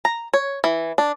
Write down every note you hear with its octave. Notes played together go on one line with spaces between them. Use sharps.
A#5
C#5
E3
D4